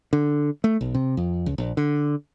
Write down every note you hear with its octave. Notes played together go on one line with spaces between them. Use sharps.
D3
A3
B1
C3
F2
C#2
A#1
D3